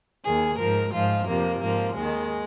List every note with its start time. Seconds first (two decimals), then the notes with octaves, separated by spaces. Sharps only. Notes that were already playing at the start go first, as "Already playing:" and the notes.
0.24 D#2 D#3 G#4
0.58 G#2 F3 A#4
0.92 G#2 F3 F4
1.26 F2 C3 F3 A#3
1.60 G#2 F3 A#3
1.94 D#2 D#3 G#3